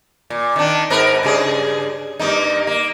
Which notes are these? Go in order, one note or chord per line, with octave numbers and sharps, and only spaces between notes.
A#2
D#3 D4
G#2 A#4 B4
G2 C#3 G#4
G2 A#3 D#4
A#3